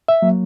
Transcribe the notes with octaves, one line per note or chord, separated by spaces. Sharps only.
E5
F#3 A#3